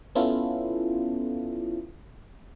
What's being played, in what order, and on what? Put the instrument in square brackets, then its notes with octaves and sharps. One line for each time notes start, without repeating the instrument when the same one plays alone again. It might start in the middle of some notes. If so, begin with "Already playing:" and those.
[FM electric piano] B3 C#4 E4 F4 A4